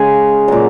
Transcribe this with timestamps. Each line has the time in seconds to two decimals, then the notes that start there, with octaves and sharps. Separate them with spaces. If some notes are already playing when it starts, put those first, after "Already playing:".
Already playing: C#3 G#3 F5 G#5
0.48 A#2 F#3 F#5 A#5